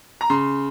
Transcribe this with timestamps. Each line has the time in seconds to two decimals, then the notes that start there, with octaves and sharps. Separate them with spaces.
0.21 A#5
0.30 C#3 C6